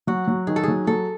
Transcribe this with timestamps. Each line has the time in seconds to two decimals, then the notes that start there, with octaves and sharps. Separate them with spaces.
0.07 F#3 F#4
0.28 F#3
0.47 D#3 G#4
0.56 A4
0.64 F#3 G#4
0.87 F#3 A4